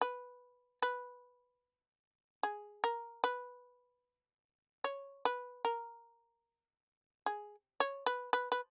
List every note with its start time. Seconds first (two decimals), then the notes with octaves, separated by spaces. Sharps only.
0.01 B4
0.82 B4
2.43 G#4
2.84 A#4
3.24 B4
4.84 C#5
5.25 B4
5.65 A#4
7.26 G#4
7.80 C#5
8.06 B4
8.33 B4
8.52 B4